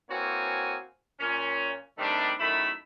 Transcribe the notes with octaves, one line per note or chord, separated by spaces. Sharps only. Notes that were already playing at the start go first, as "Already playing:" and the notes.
E3 A#3 C4 F#4 C#5 G#5
A#2 C#4
C3 D#3 G3 A3 D4
F#2 D#3 A3 E4 B5